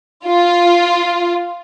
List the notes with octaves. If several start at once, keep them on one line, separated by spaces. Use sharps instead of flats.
F4